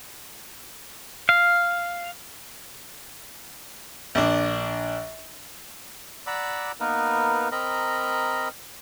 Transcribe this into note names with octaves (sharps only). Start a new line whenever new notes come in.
F5
A#1 D4
D5 F#5 A#5 B5 D6 E6
A#3 B3 D#4 A#4 B4
C4 A#4 D#5 A#5 B5